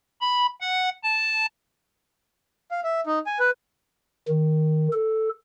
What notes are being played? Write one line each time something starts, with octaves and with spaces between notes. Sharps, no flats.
B5
F#5
A5
F5
E5
D#4
G#5
B4
D#3
A4